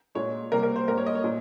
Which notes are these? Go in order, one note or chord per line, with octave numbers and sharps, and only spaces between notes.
A#2 G#3 C#5
C3 G3 A#3 A#4
A#4
C5
G#2 G3 A#3 A#4
C#5
D#5
C#5
A#2